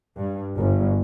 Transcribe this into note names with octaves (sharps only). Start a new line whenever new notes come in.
G2
G1